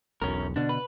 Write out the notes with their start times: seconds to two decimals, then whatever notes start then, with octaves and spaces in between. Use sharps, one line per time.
0.22 E1 B1 F#2 C#4 A#4
0.56 B2 D3 D4
0.69 B4